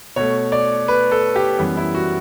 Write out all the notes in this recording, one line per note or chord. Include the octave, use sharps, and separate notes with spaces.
B2 A3 C#5
D5
B4
A4
G4
F#2 E3 G3 B3
E4
F#4